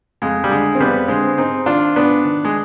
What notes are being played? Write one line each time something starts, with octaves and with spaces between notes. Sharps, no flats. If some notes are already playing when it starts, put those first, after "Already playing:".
F2 G#3
G3
D3 G#3
C4
F2 G3 B3
D3 G#3 C4
G#2 C4 D#4
D#3 D4 F4
G#2 B3 D4
D#3
G#3